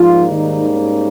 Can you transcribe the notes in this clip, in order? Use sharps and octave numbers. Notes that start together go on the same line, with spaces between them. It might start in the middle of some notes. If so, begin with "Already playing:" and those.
Already playing: G#2 F3 G3 A#3 F4
D#3 D#4
C#4